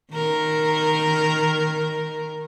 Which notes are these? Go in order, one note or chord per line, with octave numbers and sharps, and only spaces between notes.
D#3 A#4